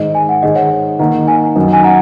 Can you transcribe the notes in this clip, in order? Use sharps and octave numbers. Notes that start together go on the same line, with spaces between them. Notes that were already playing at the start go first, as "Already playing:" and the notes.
Already playing: G#2 D#3 G#3 D#5
G#5
F#5
G#2 D#3 G#3 D#4 D#5
C#5 F#5
D#3 A#3 D#4 F#5 A#5
D#5 G#5
F#2 D#3 F#3 D#4
G#5
F#5 A#5